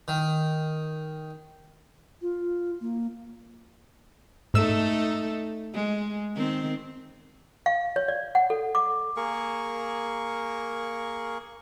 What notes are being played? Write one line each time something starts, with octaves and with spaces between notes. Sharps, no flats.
D#3
F4
A#3
G#2 A3 D#4 A4 E6
G#3
D#3 C4
F5
C#5
D5
F#5
A4
D6
A#3 G#4 A#4 C#6